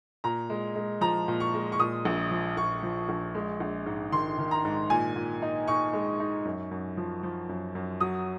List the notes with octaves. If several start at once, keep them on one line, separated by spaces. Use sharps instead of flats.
A#2 A#5
G#3
G#3
F3 A#5
A#2
C#6
G#3
C#6
A#2 D#6
A#1
F3
A#1 C#6
F3
A#1
G#3
A#1
G#2
D#3 C6
D#3
A#5
G#2
A#2 G#5
A#2
D#4
D#4 C#6
G#3
D#4
F#2
F#2
F3
F3
F#2
F#2
F#3 D#6